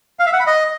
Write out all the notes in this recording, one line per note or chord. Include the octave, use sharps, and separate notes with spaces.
F5
E5
F#5
B5
D#5